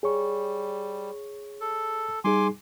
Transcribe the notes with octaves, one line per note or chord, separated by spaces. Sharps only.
G3 G#4 C#5 C#6
A4
G3 D#4 G#4 G#5 C6 D6